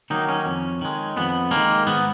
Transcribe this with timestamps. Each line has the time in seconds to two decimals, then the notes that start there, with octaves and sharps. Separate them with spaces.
0.10 D#3 F#3 A#3 D#4
0.29 C#4
0.46 F2
0.81 D#3 G#3
1.17 F2 B3
1.51 D#3 G#3 A#3
1.86 G#2 B3